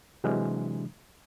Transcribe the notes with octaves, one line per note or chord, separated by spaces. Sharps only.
C3 E3 F#3 G#3 D4